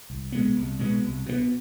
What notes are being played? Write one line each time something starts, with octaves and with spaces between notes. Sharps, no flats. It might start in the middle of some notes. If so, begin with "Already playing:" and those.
C2
B2 G#3 B3
C2
B2 G#3 B3
C2
B2 G#3 B3